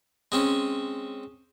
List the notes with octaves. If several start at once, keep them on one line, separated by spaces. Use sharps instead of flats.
G#3 C4 C#4